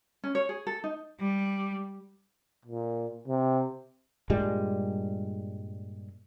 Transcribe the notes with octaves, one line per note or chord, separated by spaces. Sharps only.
C#4
C#5
G#4
A4
D#4
G3
A#2
C3
G2 A#2 G3 G#3